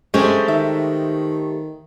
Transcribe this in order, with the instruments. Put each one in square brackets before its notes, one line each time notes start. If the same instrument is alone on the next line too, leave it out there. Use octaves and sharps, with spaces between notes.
[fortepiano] G#3 [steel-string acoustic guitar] A3 G4 C5 [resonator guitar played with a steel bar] C#4 G#4
[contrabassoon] D#3 [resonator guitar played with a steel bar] E5